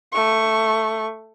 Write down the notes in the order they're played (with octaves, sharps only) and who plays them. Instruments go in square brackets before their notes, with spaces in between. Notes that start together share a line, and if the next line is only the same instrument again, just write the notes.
[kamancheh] A3 C#6